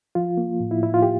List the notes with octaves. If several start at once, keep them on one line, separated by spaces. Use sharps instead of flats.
F3 F4
A#3
A2
E4
A2 E4
F4
G4